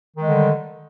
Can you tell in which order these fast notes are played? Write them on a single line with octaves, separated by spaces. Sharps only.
D#3 G#3 D3 G3